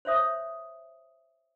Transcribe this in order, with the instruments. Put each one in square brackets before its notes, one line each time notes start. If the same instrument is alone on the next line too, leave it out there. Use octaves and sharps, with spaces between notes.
[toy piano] C5 C#5 E5 D#6